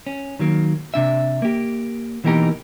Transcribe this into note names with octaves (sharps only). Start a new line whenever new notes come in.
C#4
D#3 F#3 A#3
C3 D4 E5
A#3 G4
B2 E3 A#3 D#4 G4 A#4